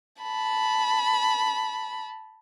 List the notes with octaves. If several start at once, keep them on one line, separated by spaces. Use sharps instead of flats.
A5 B5